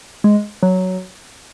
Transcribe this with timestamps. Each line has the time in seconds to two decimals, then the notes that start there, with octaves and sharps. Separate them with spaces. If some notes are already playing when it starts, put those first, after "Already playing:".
0.24 G#3
0.63 F#3